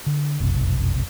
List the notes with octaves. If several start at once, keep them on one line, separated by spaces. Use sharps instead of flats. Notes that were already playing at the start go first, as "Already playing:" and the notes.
D3
F1 B1 F#2 C3